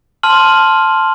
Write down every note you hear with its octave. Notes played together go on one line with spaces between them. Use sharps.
A5 C6 F6 F#7